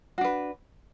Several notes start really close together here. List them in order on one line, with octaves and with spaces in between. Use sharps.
F#4 D4 B4